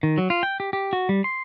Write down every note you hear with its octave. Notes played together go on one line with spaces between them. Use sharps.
D#3
F#3
F4
G5
G4
G4
F#4
G3
C6